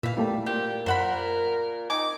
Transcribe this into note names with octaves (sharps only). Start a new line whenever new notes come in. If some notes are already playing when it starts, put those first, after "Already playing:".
A#2 E3 E5 F5 B6
G3 A3 A#3 E4
A#2 C4 G4
F#2 A#4 C5 F#5 B5 E7
C4 D#4 G#5 D6